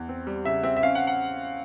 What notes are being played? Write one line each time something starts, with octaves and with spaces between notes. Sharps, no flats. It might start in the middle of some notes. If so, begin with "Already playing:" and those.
Already playing: E2
C4
G3
C#3 E5
C4 E5
E5
C#4 F5
F#5
F#5